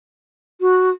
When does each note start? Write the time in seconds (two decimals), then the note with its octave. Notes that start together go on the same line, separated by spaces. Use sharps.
0.61 F#4